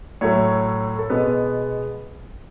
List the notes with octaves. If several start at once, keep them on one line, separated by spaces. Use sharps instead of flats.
A2 F#3 A3 C#5
A4
B2 G#3 B3 B4